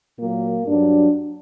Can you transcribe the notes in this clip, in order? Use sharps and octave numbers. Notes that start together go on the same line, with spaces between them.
A#2 F#3 A#3
G2 F#3 D4